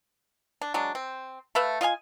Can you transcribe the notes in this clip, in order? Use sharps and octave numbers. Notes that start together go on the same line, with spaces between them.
D4
F#3 G#3 D4
C4
A3 B4 E5 F5
F4 D#5 F5 G#5